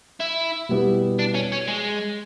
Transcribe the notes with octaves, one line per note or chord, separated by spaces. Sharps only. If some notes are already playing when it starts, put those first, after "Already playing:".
E4
B2 G3 B3 E4 G4
D4
C#4
C#4
G#3